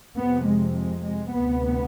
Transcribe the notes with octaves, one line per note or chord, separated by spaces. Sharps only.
F2 C3 B3
G#3
G#3
G#3
D2 C3 B3